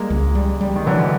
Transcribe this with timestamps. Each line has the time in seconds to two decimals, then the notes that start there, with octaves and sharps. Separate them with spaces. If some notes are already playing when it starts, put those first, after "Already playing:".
Already playing: G3 G#3 A#3
0.10 C#2
0.35 G3
0.61 G3
0.76 D#3
0.86 D3 E3 F#3